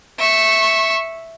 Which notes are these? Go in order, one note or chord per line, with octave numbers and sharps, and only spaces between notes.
E5 C#6